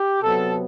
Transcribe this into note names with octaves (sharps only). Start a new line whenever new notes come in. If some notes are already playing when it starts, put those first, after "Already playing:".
Already playing: G4
C3 F#3 B3 A4